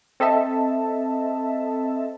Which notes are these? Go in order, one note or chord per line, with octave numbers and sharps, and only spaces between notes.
C4 A4 D#5 E5 A5